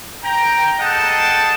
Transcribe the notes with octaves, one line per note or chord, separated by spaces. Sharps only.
G5 A#5
G#4 A4 D#5 F#5 G5 A5